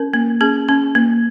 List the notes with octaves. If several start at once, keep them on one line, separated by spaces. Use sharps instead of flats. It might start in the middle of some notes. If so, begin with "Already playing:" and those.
Already playing: C#4 A#4
A#3
C#4 G#4
C#4
A#3